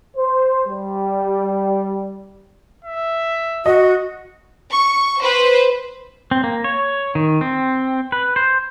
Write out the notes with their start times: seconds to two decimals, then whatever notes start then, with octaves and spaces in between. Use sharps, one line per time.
0.17 C5
0.67 G3
2.85 E5
3.66 F#4 D#5
4.70 C#6
5.21 B4 C5
6.31 C4
6.44 A#3
6.64 C#5
7.15 D#3
7.41 C4
8.12 B4
8.36 C5